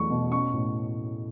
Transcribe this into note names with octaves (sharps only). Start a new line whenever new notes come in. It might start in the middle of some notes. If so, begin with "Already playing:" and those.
Already playing: E2 F#3 G3 A3 C#6
B2
C#4 C#6
A2